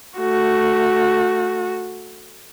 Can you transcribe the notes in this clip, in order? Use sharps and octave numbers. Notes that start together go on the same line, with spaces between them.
A3 F#4